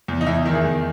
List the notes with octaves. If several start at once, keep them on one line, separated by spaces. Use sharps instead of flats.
E2
D#4
E2 E4
D#3 E4
G#4
E2